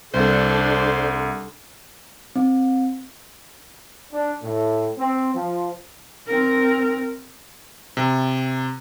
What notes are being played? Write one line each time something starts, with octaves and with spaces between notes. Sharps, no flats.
C2 D4 A4 C5
C4
D4
A2
C4
F3
C4 A#4
C3